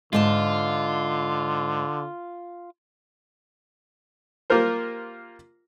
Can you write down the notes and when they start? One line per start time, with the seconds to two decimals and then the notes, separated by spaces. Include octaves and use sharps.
0.13 G#2 D3 F4 G#4 A5
4.50 A#3 F4 G4 A#4 C5